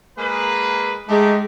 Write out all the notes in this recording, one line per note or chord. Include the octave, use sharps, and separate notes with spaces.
G#3 A#3 B4
G#3 A3 D#4 G4